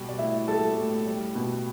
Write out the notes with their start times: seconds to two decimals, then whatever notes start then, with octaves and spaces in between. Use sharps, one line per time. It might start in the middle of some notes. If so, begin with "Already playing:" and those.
Already playing: B2 G3
0.09 D5
0.18 A2 E4 E5
0.48 G3 A4 A5
0.77 A2
1.07 G3
1.35 B2